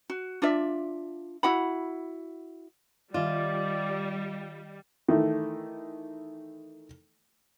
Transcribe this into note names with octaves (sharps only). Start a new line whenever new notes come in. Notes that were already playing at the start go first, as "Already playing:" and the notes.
F#4
D4 F4 D5 E5
E4 F#4 F#5 B5
D#3 G3 F4 D5 D#5
D#3 E3 A3